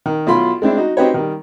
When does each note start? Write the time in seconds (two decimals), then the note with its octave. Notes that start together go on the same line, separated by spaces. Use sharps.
0.06 D#3
0.27 B1 E4 F4 B5 C6
0.62 G#3 C4 D4 E4
0.77 D#4 F#4
0.97 C4 D#4 F#4 G4 B4 C#5
1.14 D#3 G3